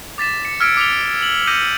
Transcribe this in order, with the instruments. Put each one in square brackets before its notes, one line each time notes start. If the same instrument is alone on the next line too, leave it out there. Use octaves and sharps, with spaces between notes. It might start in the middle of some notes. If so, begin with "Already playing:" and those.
[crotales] D6 A6 B6 E7
C#7
E6 F6 G#6 B6 C#7 D7
D6 B6 C#7 F7 G7
F#7
D6 E6 G6 A#6 C#7 D#7